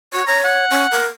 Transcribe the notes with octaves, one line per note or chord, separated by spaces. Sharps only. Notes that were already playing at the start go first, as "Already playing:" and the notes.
F#4 C#5
C#5 A#5
F#5
C#4
A#4